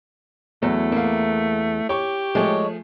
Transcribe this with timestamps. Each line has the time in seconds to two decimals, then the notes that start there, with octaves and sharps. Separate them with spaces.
0.63 E2 F#3 A3
0.92 A#3 F5
1.89 G4 C#5 C#6 D6
2.35 F3 G#3 A3 G#4 C#5